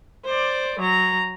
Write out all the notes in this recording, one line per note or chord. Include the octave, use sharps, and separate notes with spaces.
C5 D5
F#3 A#5